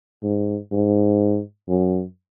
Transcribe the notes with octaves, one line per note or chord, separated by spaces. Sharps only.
G#2
G#2
F#2